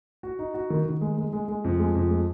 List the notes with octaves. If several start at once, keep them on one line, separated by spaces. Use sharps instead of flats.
F#4
D#4
F#4
D#3
D#3
G#3
G#3
G#3
G#3
F2
G#3
F2
G#3